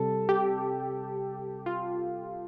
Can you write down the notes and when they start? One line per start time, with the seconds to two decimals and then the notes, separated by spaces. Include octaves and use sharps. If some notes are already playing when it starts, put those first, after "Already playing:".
Already playing: C3 G3 A4
0.29 G4
1.66 F4